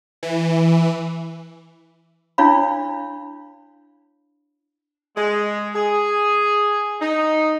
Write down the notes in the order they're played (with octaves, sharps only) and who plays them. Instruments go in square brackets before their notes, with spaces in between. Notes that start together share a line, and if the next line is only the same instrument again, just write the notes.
[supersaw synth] E3
[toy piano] D4 E4 C#5 F5 B5
[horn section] G#3
G#4
D#4